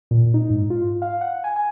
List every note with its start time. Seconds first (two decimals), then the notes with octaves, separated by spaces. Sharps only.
0.11 A#2
0.34 D#4
0.50 G#2
0.70 F4
1.02 F5
1.21 F#5
1.44 G#5
1.56 G#5